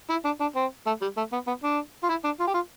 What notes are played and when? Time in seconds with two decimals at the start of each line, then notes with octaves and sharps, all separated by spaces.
0.10 E4
0.24 D4
0.40 D4
0.56 C4
0.86 A3
1.01 G3
1.17 A3
1.32 B3
1.47 B3
1.63 D4
2.03 F4
2.09 E4
2.24 D4
2.39 F4
2.47 G4
2.54 F4